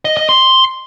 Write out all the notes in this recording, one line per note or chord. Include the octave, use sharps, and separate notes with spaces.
D#5
D#5
C6